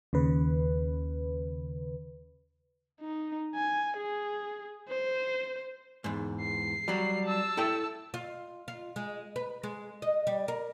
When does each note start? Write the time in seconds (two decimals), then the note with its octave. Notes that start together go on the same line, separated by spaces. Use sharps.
0.13 D#2 C#3 B4
3.01 D#4
3.55 G#5
3.97 G#4
4.89 C5
6.04 E2 G#2
6.40 C7
6.88 F#3 G3
7.26 A5 E6
7.57 E4 A4 G5
8.14 F4
8.68 F4
8.96 G#3
9.36 B4
9.63 G#3
10.02 D#5
10.27 G3
10.48 A#4